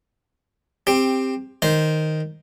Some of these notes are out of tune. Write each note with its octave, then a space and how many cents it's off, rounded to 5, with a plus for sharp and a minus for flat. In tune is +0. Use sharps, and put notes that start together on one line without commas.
C4 +5 G4 +15
D#3 +0 C5 +0